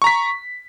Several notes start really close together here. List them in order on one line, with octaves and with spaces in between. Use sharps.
C#6 A#5 B6